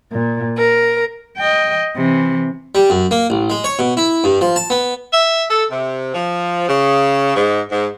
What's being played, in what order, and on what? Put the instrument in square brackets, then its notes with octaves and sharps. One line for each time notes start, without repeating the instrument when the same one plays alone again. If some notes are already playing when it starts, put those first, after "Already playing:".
[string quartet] A#2
A#4
[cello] D#5 G5
C3 E3
[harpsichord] G3
F#2
A#3
A1
G#3
C#5
B2
E4
G2
F3
A5
B3
[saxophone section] E5
A4
C3
F3
C#3
G#2
G#2